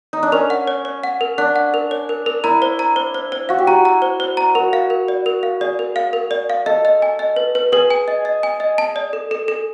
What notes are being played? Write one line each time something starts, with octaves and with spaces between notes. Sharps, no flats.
D#4
D4
C#4 A#4
F#5
C#5
C#5
F#5
A#4
D4 F#5
F#5
A#4
C#5
A#4
A#4
E4 A#5
C5
A#5
C5
C5
C5
F#4 F5
G4
F#4 A#5
A#5
C5
C5
A#5
F#4 A#4
F5
A#4
D5
A#4
F5
G#4 D5
A#4
F5
A#4
D5
F5
A4 D#5
D#5
G#5
D#5
B4
B4
G#4 B4
G#5
D#5
D#5
G#5
D#5
A5
D5
A4
A4
A4